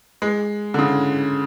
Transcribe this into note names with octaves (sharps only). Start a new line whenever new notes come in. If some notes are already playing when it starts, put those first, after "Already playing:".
G#3
D3
C#3